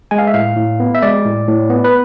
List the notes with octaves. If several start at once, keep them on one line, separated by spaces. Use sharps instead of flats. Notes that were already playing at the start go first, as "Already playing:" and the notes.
G#3 G#5
F5
E5
A2 F5
A2
B3
E5
G#3 D5
A2
A2
B3
B4